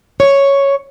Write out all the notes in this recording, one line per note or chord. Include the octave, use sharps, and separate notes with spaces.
C#5